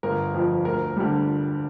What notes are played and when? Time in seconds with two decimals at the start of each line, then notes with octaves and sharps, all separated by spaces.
0.03 G1 A#4
0.34 F2 F3
0.65 D2 A#4
0.96 D3 G3